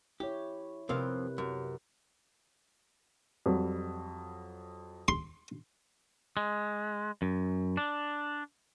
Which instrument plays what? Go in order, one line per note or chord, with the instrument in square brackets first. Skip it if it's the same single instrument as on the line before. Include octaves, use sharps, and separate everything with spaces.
[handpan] E4 C#5 [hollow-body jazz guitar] G4
[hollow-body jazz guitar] F2 C4 F5 [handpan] C3 A#4 B4
[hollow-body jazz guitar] F#2 [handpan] A#4
[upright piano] F2 F#3 G3
[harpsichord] C6
[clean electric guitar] G#3
F#2
D4